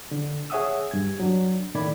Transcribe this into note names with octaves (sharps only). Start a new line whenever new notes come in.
D3
G#4 C#5 E5 F#5 D#6 E6
G2 G#6
F#3 D4
A2 D#3 E4 D5 B5 G#6